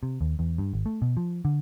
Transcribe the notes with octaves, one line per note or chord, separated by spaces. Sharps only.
C3
D#2
E2
G2
G#1
A3
B2
F3
D3